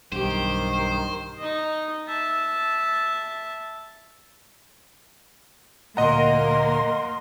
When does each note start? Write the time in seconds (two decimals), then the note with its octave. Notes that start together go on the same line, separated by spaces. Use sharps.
0.12 B1 G2 D#3 G4 C5
1.38 D#4 D#5
2.07 E5 A5
5.97 D2 A#2 A#3 A#4 D#5 F#5 A#5 C6